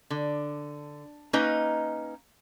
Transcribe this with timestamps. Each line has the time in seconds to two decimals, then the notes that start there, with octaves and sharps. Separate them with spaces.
0.10 D3
1.33 A#3 C#4 D#4 B4 D#5 A#5